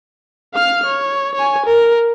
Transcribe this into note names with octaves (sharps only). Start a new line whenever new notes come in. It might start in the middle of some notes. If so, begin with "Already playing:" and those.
F5 F6
C#5
C#5 G#5
A#4